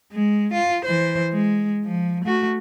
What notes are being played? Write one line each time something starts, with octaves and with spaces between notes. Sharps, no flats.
G#3
F4
E3 C5
G#3
F3
A3 F#4